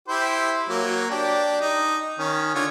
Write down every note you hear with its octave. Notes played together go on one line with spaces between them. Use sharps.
E4 G4 C5
F#3 A#3
D4 G4
D#4
D#3 C#4
D3 F4 C#5